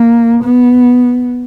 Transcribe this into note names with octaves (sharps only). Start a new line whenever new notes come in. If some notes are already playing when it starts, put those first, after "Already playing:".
Already playing: A#3
B3